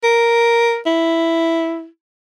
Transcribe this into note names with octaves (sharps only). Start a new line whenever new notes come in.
A#4
E4